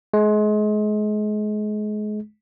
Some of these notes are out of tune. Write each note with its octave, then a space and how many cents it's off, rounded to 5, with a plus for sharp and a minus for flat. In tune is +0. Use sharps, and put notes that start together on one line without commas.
G#3 +30